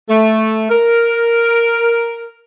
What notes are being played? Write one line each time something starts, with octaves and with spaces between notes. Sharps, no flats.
A3
A#4